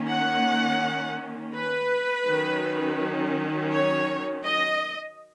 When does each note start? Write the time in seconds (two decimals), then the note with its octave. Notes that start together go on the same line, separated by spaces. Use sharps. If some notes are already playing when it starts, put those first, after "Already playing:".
Already playing: D#3 A#3 C#4
0.09 F#5
1.54 B4
2.26 D#3 F#3 C#4
3.71 C#5
4.43 D#5